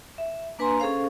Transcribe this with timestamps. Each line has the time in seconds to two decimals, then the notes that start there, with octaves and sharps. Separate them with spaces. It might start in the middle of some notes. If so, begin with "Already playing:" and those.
0.18 E5
0.59 A#3 D4 B4 G#5 A#5 C6
0.80 C#4 G#4 A4 C5 F5